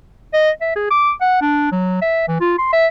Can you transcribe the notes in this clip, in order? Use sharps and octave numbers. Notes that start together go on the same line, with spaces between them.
D#5
E5
G#4
D6
F#5
D4
F#3
E5
E3
F4
C6
E5